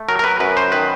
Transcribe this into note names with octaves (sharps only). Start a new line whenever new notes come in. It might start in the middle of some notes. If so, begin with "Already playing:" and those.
Already playing: A3
F#3 A#4
A#4
B4
F#2 B4
C5
D#3 B4